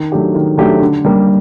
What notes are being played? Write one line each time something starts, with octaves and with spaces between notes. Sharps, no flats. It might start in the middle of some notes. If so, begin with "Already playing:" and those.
Already playing: D#3
F#3 A3 D4 G4
D#3
F#3 A3 D4 G4
D3
G3 A#3